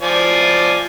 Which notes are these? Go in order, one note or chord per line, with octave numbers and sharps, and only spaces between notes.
F3 D5 G#5